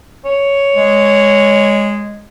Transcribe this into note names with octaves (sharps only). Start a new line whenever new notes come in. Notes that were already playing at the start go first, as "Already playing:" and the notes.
C#5
G#3